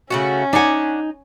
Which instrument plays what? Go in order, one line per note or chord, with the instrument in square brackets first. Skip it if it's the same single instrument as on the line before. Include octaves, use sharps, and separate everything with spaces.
[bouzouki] C#3 A3 F#4 [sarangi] C#4
[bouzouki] D4 F#5 [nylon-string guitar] D#4 G#5